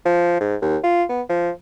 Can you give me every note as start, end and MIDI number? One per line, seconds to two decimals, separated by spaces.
0.05 0.39 53
0.40 0.56 44
0.62 0.77 39
0.84 1.04 65
1.09 1.22 59
1.29 1.50 53